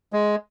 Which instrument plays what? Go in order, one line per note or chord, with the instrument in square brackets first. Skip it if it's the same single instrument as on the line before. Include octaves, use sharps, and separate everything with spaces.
[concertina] G#3